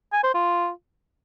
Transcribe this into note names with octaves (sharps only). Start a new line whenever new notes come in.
G#5
C5
F4